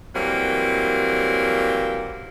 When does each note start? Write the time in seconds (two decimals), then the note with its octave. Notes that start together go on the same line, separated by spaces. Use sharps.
0.15 E3 F#3 G3 A#3 C4